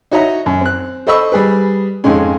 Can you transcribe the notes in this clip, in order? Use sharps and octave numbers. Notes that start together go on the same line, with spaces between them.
D#4 F#4 C#5 D#5 E5 A#5
F#2
C4 F#6
A4 C5 D#5 B5 C#6 E6
G3 G#4 B4
F2 G#2 G#3 C#4